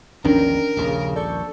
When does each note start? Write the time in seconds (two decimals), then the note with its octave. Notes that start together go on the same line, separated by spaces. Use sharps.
0.24 A#1 E2 D#3 C#4 D4 A#4 G5
0.77 D#1 A#1 C#3
1.16 A4 D5 C#6 G6